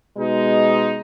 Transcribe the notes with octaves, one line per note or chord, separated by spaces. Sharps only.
B2 G#3 D#4